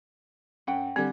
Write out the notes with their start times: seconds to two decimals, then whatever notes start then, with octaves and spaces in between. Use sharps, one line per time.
0.67 F#2 C#4 F#5 G5
0.96 D3 G3 C4